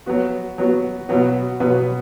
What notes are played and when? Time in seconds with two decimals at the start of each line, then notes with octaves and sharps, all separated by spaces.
0.06 F#3 B3 F#4
0.58 F#3 B3 F#4
1.09 B2 F#3 B3
1.60 B2 F#3 B3